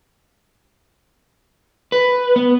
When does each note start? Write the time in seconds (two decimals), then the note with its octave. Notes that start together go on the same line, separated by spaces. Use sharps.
1.92 B4
2.36 B3